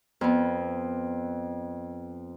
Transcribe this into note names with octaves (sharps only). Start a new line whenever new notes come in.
F2 B3